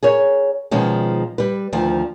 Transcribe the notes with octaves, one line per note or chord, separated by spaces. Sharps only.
G#4 A#4 C#5
B2 D#3 F3 G#3 C#4
G3 B4
D2 D#3 F3